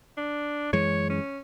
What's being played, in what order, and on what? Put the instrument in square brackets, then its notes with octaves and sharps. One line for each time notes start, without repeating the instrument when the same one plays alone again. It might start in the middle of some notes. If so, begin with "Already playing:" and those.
[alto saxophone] D4
[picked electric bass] F#2 E3 G#3 [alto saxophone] C#5
[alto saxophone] C#4